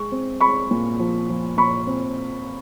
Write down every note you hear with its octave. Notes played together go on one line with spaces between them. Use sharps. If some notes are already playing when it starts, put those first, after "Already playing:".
Already playing: G#3 C#6
C4
G#3 B5 C#6
A#2
F3
F3
A#2 B5 C#6
C4